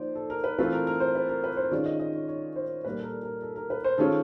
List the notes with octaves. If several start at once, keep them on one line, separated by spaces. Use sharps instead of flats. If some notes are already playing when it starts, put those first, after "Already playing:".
Already playing: F3 A#3 D#4 C5 D5
A4
A#4
B4
E3 A3 C4 F4 B4
A#4
A#4
C5
B4
A#4
B4
C5
D#3 G#3 C#4 F4 D5
D#5
D#5
C#5
C#5
C5
A#2 G3 A#3 B4
A4
A#4
A#4
A4
A#4
B4
C5
D#3 G#3 C#4 F4 A4